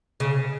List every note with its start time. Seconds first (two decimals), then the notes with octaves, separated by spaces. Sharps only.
0.20 C#3